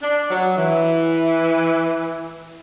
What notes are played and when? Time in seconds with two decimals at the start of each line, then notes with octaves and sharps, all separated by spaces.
0.02 D4
0.30 F#3
0.58 E3